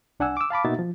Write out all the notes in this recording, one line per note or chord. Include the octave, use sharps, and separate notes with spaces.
C2 D4 F#5 G#5 E6
D6 E6
F5 A5 B5 D6
B2 A#3 D#4 F#4 E5 A6
F3